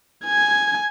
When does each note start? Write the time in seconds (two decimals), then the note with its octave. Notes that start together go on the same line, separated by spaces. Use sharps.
0.25 G#5 G#6